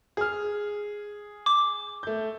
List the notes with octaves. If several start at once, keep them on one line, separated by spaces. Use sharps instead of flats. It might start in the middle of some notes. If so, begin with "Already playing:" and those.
G#4 F6
D6
A3 G6